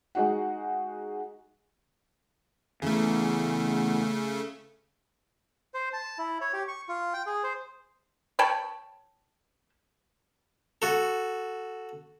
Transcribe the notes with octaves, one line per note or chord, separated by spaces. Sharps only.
G#3 D#4 F#4 F#5
E2 C#3 A3
C5
A5
E4
C#5
G4
C#6
F4
G5
G#4
C5
C#5 G5 A5 B5
F#4 A4